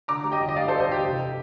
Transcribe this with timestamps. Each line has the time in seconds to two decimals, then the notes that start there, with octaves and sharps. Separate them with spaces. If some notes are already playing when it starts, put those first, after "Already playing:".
0.08 D3 A#5 D6
0.24 G3
0.32 D#5 G5
0.40 G1
0.49 D#5
0.55 G3 D5 F5
0.68 A4 C5
0.71 G3
0.80 C5 D#5
0.88 G1 G4
1.04 F1